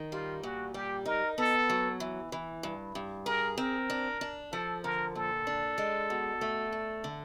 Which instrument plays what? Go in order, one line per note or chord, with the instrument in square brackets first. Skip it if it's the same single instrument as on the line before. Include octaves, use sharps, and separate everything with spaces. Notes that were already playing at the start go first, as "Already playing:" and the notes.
Already playing: [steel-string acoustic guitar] D#3
[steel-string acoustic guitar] G3 [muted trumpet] F4
[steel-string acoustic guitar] A#2 [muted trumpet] F#4
[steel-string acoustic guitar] G3 [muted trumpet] G4
[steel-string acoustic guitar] D#4 [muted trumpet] A#4
[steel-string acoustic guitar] B3 [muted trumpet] A4
[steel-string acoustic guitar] F#3
E3
E3
G2
G2
[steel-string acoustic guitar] G#4 [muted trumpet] A#4
[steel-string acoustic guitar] C4 [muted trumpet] A#4
[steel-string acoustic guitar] D4
D4
[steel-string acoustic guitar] F3 [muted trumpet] A4
[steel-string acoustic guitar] D3 [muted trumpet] A#4
[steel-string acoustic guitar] A#2 [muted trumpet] A4
[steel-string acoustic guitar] D4
G#3
B2
A3
D4
D3